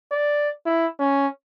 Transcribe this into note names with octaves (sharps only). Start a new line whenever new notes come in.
D5
E4
C#4